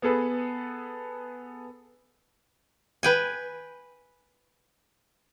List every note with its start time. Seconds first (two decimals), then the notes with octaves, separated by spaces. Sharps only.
0.02 B3 G#4 A4 B4
3.03 B4 G5 G#5